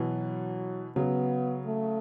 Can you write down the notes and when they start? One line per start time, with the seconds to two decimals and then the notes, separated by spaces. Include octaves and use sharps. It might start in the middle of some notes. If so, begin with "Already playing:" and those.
Already playing: B2 E3 F#3
0.96 C#3 F#3 B3
1.66 A3